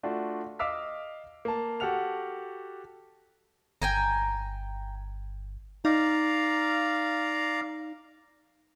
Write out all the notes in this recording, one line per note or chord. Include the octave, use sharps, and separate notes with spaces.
A3 D4 F4 F#4
D#5 F5 D6 E6 F6 B6
A#3 A5
F#4 G4 A4 F#5 F6 F7
G1 G5 G#5 A#5
D#4 D5 F5 A#5